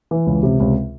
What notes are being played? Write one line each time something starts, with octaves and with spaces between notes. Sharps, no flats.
E3
C#2
C3
C#2